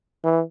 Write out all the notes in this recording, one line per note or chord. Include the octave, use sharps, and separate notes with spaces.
E3